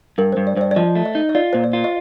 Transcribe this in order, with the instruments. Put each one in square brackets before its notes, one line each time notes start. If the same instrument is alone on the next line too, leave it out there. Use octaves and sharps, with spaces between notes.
[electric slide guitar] G2 [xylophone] A#4
[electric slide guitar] G2 [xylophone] C5
[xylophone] D5
[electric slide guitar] G2 [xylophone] C5
[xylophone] D5
D5
[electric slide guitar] F3 [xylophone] D#5
[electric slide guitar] A3
[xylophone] D#5
[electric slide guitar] D#4
[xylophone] D#5
[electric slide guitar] F4 [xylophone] D5
[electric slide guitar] A#2 [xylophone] C5
[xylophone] D5
[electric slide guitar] F4
[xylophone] D#5